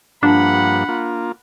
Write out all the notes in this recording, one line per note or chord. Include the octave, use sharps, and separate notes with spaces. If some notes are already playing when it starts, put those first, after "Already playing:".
G2 F3 A#3 D4 F#5 B5
A#3 F4